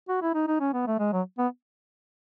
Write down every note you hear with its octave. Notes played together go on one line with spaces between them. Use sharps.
F#4
E4
D#4
D#4
C#4
B3
A3
G#3
F#3
B3